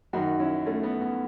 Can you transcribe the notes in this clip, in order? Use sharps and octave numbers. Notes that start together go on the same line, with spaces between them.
F#2 D#3 D#4 F#4
C#4 E4
A3 C#4
B3
B3